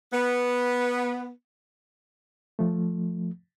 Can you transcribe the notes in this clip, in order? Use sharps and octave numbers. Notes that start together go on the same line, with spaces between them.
B3
F3 A3